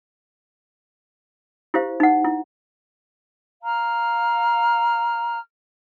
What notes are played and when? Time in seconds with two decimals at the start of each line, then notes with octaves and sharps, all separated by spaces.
1.74 E4 G4 C5 F5
2.00 D#4 F#5
2.24 E4
3.63 F5 A#5 F6